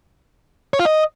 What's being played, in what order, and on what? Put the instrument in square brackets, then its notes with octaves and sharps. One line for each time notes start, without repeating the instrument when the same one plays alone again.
[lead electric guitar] C#5
F4
D#5